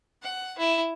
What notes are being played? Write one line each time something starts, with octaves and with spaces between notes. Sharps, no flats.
F#5
E4